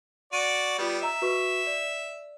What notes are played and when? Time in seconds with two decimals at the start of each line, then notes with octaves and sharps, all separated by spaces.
0.33 F#4 D5 D#7
0.78 G3 B3 F4 D5
1.01 D#5 E5 A#5 E6
1.22 F#4 B4 C#6
1.67 D5